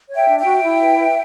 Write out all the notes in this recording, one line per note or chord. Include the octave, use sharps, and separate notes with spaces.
C#5
E5 G5
D4
E5 G5
F#4
E4
B4
B4